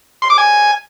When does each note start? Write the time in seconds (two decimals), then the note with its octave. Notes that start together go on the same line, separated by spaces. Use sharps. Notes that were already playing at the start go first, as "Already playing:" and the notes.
0.22 C6
0.30 D6
0.38 G#5